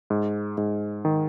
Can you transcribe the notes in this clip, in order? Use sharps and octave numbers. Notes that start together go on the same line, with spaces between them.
G#2
G#2
D#3